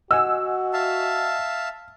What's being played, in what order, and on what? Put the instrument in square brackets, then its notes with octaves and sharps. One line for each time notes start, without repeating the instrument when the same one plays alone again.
[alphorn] F#4 [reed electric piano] D#5 F#5 G#5 [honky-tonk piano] E6
[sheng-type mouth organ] E5 F5 A5